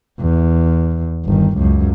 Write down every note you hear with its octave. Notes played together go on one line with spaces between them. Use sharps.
E2
G1 D#3
C#2 F#2